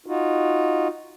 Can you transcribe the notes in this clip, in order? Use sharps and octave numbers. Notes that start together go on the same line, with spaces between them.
D#4 F4 F#4